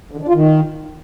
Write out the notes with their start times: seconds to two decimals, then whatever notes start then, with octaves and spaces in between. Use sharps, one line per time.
0.11 D3
0.17 D#3
0.23 D4
0.28 F4
0.34 D#3